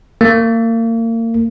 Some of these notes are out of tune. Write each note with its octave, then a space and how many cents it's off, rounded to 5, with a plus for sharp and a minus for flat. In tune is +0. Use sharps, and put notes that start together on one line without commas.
A#3 -35